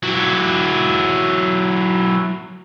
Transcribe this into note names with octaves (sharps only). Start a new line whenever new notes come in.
F#3 E4